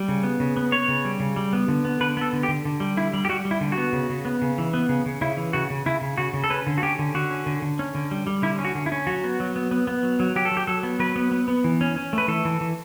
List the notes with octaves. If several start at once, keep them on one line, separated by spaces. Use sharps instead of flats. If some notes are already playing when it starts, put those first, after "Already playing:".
Already playing: G3
C#3
B3
C#3
B3
B3 C#5
C#3
G3
C#3
G3
B3
D3
B3
D3 B4
B3 A4
D3
G4
D3
D3
G3
D3 E4
G3
G4
G3 F#4
G3
E4
D3
F#4
B3
C#3
C#3
B3
C#3
E3
B3
C#3
C#3
C#3 E4
E3
C#3 F#4
C#3
C#3 E4
C#3
C#3 F#4
C#3
A4
C#4 B4
D3
F#4
C#4 G4
D3
D3 F#4
C#4
D3
D3
C#4
D3
G3
G3
D3 E4
C#4
F#4
D3
E4
C#4
F#3 F#4
B3
F#3
B3
B3
B3
F#3
F#3
F#3 G4
A4
F#3
G4
F#3 A4
B3
F#3 B4
B3
B3
B3
E3
C#4
C#4
A3 B4
E3 A4
E3
E3